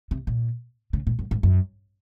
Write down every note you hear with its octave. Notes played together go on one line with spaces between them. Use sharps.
C3
A#2
C#3
A#2
F#2
G#2
F#2